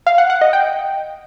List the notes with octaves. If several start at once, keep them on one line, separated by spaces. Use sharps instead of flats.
F5
F#5
F#5
D#5
G5